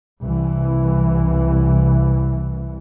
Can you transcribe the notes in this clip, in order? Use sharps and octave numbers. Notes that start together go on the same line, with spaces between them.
C2 E3